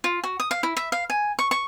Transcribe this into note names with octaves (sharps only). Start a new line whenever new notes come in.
F4
F#4
D#6
F5
E4
E5
F5
G#5
C#6
C#6